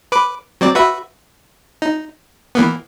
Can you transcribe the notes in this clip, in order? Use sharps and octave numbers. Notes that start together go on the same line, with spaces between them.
B4 D6
F#3 C4 D5
F#4 B4 E5
D#4
E3 A#3 B3